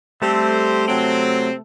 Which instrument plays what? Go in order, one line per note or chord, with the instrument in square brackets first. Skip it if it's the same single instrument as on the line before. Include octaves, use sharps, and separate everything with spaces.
[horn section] G3 C4 G4 C5 [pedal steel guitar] A3 A4
[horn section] C3 F#3 C4